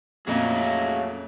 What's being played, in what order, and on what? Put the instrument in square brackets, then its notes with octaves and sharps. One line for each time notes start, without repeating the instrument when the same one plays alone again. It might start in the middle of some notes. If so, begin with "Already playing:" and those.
[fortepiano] F2 A#2 [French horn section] F#3 A3 C#4 [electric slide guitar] G#4 D#5 F5